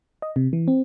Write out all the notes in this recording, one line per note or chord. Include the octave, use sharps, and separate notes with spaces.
D#5
C3
E3
C4